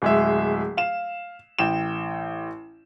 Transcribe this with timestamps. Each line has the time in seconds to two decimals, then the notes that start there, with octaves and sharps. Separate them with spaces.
0.02 D1 G#3 E5
0.77 F5 E7
1.59 A1 G5 E7